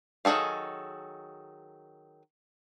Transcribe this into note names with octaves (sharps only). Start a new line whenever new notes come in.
D#3 F#3 G#4 A4 F5